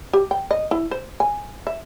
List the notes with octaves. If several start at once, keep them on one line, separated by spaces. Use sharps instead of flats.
G4
G5
D#5
E4
C5
G#5
E5